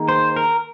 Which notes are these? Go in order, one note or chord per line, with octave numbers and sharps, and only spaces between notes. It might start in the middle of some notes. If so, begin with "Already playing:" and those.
Already playing: D#3 A#3 D#4 G#4
C5
A#4